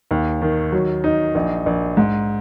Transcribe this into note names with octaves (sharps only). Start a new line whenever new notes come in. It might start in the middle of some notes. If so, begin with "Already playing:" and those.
D#2
D#3
F#3
D#4
A#1
A#1
G#2